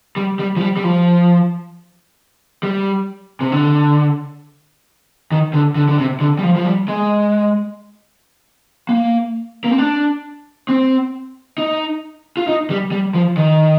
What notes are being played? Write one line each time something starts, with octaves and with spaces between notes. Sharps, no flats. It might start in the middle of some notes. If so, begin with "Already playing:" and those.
G3
G3
F3
G3
G3
F3
G3
C3
D3
D#3
D3
D3
D3
C3
D3
G3
F3
F3
G3
G#3
A#3
A#3
C4
D4
C4
D#4
F4
D#4
G3
G3
F3
D#3